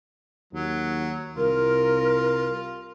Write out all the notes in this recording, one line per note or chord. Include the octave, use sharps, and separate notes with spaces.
D#2 F#3
C2 F4 A#4